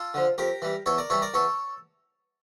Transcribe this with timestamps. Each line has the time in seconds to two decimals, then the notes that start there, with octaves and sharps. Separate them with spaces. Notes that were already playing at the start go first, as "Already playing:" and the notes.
Already playing: F4 A4
0.14 D3 F3
0.38 F2 G4 A#4
0.62 E3 G3
0.86 E2 A4 C#5
0.98 A#4 D5
1.10 E3 G3 A4 C#5
1.22 A#4 D5
1.34 E2 A4 C#5